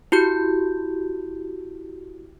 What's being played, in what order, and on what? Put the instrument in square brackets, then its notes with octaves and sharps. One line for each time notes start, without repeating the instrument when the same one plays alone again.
[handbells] E4 F#4 G4 G6